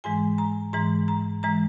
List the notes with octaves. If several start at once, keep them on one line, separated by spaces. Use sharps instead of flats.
G#2 E3 G#3 G#5
A#5
G#2 E3 G#3 A#5
A#5
E3 G#3 A#5